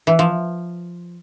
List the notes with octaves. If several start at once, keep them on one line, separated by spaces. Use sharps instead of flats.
E3
F3